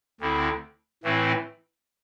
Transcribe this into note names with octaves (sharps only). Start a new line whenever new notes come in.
D2 D3 C4 E4
A2 E3 A3 C4 E4